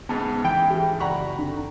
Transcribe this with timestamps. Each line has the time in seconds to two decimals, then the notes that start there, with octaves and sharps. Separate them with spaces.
0.09 E2 G#2 C#3 B3 A5
0.44 E3 G5 B5
0.70 G4 G#4
1.00 F#1 D5 F#5 A#5 B5 C#6
1.38 D3